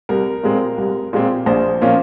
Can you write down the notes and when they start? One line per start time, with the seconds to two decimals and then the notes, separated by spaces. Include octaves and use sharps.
0.09 C2 A#4
0.43 A#2 G#3 C4
0.78 C2
1.13 A#2 G#3 C4
1.46 A#1 C5
1.82 A#2 F3 A#3 C#4